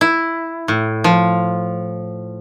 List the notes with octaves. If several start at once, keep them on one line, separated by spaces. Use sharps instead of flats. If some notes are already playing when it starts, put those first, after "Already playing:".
E4
A2
F3